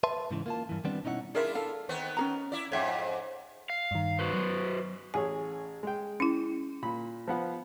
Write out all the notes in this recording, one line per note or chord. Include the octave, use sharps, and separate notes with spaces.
B4 E5 A5 C6
G#2 C#3 E3
A#3 F4 A5
G2 E3
D#3 G3 B3 C4 D4
B2 C#4 D#4 E4 D5 F#5
D4 E4 F4 G#4 A#4 E5
A4 F5
D#3 B3 C4
C#4 G#4 A#5
E4 D5
F2 G#2 C#5 E5 G5
F5
G2 D#3
F#4 B4 C5
F#3
A1 G#4 C#5 G#5
G#3 G5
C#4 E4
A#2 B5
F3 B3 F#5